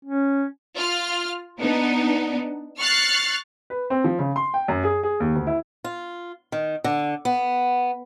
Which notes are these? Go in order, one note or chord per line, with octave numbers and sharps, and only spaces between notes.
C#4
F4 F6
B3 D4 D#4
C#6 F6 F#6 A6 C7
B4
C4
F3
C#3
C6
G5
F#2
G#4
G#4
D#2
D2
E4
F4
D#3
D3
B3